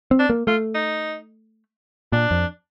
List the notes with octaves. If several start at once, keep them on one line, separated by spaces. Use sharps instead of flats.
C4
D4
A#3
A3 F4
D#4
A#2 D4
F2